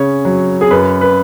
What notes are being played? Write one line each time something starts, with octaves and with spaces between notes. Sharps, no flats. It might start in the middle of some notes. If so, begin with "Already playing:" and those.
Already playing: C#3 C#4 C#5
F#3
G#4
F#2 B4
B4